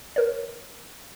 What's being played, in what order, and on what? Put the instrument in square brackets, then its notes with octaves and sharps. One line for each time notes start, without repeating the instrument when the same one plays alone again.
[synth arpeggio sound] A#4 C#5